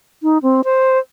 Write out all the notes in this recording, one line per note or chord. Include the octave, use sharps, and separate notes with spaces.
D#4
C4
C5